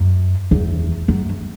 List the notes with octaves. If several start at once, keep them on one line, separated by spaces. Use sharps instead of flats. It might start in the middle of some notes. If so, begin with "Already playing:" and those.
Already playing: F#2
E2
F#2